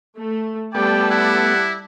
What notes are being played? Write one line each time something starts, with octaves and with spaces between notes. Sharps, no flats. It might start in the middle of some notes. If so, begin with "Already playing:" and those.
A3
G3 A3 B3 D5 G5 A5
E4 F#5